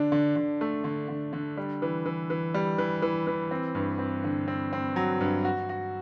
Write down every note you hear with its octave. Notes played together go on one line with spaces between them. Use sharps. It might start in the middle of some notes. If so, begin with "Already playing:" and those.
Already playing: D3 D4
D3
D3
A3
D3
D3
D3
G3
E3
E3
E3
G3
E3
E3
E3
C4
G2
C4
D3
C4
C4
F#3
G2
F#4
F#4